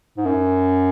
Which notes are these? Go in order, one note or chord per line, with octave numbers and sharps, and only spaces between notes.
G#2
F#2